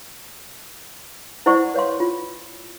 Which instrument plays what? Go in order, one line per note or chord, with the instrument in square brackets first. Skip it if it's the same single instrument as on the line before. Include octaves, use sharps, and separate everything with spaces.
[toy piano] E4 C5 D5 F#5 C#6
B4 C#5 F5 C6
F4